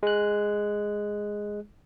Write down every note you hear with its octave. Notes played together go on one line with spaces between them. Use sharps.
G#3 F#6